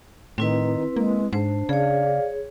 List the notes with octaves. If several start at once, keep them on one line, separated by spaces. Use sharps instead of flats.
A2 D#3 C4 E4 B4
G#3 A#3
G#2 D4 C5
C#3 G#4 C#5 D5 F5